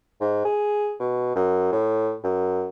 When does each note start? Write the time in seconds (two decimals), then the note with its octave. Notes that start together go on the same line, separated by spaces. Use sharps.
0.21 G#2
0.45 G#4
1.00 B2
1.35 F#2
1.72 A2
2.24 F#2